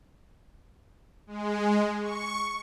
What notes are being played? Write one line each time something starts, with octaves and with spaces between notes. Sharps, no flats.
G#3
C#6